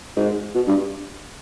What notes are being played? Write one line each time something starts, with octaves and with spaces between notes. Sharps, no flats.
G#2
B2
G2